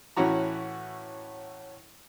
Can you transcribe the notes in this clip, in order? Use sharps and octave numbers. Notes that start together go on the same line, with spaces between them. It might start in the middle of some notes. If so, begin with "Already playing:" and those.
A2 E3 C#4 E4 F#4 A#5